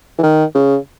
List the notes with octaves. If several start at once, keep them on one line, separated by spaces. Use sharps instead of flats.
E3
D#3
C#3